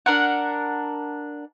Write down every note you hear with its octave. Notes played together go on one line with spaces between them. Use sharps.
D4 A#4 F#5